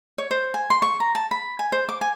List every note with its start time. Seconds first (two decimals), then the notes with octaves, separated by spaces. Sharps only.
0.18 C#5
0.31 C5
0.54 G#5
0.70 C6
0.82 C#6
1.00 A#5
1.15 A5
1.31 B5
1.59 G#5
1.72 C5
1.89 D6
2.01 G#5